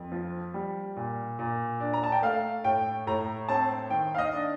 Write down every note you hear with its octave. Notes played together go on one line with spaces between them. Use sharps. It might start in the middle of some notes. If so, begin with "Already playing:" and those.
Already playing: F2
F3
G3
A#2
A#2
D4
A#5
A5
G5
A3 F5
A2 G5
A2 A#5
C4 A5
D#3 G5
F5
D#5
D4